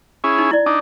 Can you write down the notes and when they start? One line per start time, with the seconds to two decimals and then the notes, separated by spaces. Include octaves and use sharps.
0.24 C#4 E4 G#4
0.38 D#4
0.51 E4 D5
0.66 D4 D#4 A5